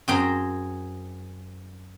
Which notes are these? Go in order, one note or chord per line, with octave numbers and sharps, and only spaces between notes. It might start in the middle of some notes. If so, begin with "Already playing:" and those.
F#2 C4 G#4 G5 A#5